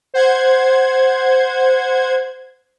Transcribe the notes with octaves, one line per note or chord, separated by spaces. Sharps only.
C5 F#5 G#6